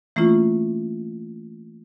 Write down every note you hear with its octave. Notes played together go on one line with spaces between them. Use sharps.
E3 A3 A#3 C#4 E4 F4